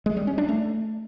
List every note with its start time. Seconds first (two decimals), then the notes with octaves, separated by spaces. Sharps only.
0.06 G#3
0.17 G3
0.27 C#4
0.38 D4
0.48 A3